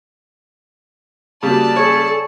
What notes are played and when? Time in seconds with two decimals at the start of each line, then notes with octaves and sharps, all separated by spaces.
1.43 C#3 G3 A#3 F#4 D5 A5
1.76 G#4 A4 C#5